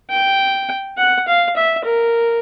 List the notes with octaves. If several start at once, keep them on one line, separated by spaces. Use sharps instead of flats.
G5
F#5
F5
E5
A#4